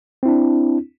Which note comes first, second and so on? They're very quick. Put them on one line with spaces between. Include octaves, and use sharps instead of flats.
C4 E4 D4